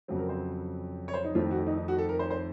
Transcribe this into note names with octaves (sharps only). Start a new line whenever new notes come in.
F2 C#3 F#3 C4
A#4
C5
C#5
C5
D#4
F2 D#3 A3 C4 F4
F#4
D#4
D#4
F#4
A4
A#4
C5
C5